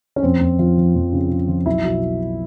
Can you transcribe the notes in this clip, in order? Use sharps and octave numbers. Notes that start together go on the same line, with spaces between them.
C#4
F2 C4
F2
F3 F4
F3
F2
C#3
C#3
F3
B1 E4
B2